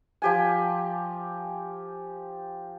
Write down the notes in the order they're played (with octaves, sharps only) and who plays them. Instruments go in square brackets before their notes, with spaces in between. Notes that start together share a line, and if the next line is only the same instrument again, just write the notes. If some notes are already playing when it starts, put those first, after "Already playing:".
[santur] F3 G4 G#5